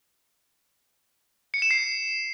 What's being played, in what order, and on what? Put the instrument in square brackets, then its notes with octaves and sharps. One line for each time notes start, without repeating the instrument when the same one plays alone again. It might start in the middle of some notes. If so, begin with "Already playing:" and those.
[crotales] C#7
E7
C7